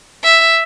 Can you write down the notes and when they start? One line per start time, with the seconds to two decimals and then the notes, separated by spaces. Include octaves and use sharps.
0.24 E5